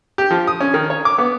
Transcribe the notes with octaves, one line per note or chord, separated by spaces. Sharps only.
G4
F3
D#6
C#4
D#3
C#5
D6
B3